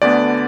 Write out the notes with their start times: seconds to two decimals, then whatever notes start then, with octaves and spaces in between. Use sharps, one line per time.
0.02 D2 D3 B3 D4 D5